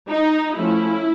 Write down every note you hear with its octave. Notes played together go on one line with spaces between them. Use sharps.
D#4
F3 A3 C#4 E4